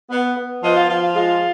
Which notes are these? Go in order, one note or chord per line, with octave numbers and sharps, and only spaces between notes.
B3
B3
F3 B4 D#5
F4
F3 F4
F4
G#3 F4